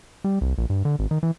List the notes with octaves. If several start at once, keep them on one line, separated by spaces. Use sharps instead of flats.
G3
C2
A#1
G2
D3
G#1
D#3
E3